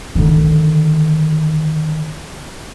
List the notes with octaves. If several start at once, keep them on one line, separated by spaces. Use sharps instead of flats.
D3 D#3